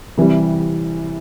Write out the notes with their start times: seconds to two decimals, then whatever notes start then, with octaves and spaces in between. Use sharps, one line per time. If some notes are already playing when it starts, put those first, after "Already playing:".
0.17 C3 E3 G3